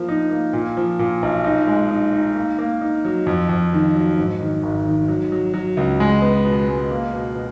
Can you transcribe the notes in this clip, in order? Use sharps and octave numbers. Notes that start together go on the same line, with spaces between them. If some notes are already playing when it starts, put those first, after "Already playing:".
Already playing: F3 A#3
D#4
A#3
A#2
F3
A#2
B1
D#4
G#3
D#4
D#4
A#3
A#3
D#4
F#3
F2
F2
D#3
F#3
G#2
D#3
G#1
D#3
F#3
F#3
F#3
C#2
G#3
B3
B2
G#3
A#3
B2
B2